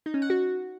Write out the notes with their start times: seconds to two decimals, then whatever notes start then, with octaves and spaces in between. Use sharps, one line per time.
0.06 D#4
0.14 C#4
0.22 F#5
0.30 F#4